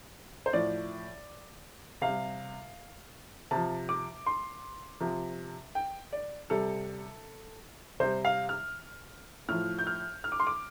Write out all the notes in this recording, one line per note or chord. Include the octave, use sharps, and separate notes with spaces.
C5
A2 F3 D5
C3 F5
G3
C3 F3 A5
D6
C6
C3 F3
G5
D5
C3 G3 A4
C3 G3 C5
F5
F6
A2 F3 F6
G6
F6
F6
D6
C6
D6